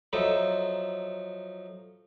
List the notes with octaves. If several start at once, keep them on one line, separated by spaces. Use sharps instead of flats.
F3 F#3 D#4 A4 E5